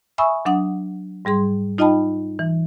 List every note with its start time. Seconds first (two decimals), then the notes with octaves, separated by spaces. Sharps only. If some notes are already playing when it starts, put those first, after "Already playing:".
0.18 E5 G#5 B5 C#6 D#6 E6
0.45 F#3 D4 F#5 D#6
1.25 G#2 G3 G#4 C6
1.78 D#4 F4 D#5 G5 A5 B5
2.39 E3